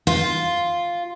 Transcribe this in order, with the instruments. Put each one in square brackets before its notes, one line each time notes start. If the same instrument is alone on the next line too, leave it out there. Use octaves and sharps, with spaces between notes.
[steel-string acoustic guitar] F4